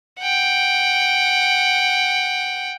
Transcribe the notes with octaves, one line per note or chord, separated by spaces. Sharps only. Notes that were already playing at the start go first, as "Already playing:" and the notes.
F#5 G5